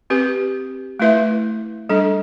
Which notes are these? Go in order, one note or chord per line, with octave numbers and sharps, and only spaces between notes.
C4 G4 B4
A3 E4 B4 E5
G3 D4 A4